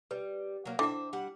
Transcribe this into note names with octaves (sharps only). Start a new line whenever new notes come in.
G3 B4
F#3 A#3
D3 E4 C5 E5 G5 D6
G3 F#5